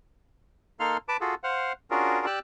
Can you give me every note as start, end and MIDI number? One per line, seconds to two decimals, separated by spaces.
0.80 0.97 58
0.80 0.97 63
0.80 0.97 69
0.80 0.97 77
0.80 0.97 84
0.80 0.97 89
1.08 1.17 71
1.08 1.17 81
1.08 1.17 86
1.21 1.35 65
1.21 1.35 66
1.21 1.35 68
1.21 1.35 69
1.44 1.73 72
1.44 1.73 77
1.44 1.73 78
1.91 2.26 61
1.91 2.26 62
1.91 2.26 65
1.91 2.26 66
1.91 2.26 68
1.91 2.26 70
2.26 2.39 67
2.26 2.39 74
2.26 2.39 86
2.26 2.39 88
2.26 2.39 90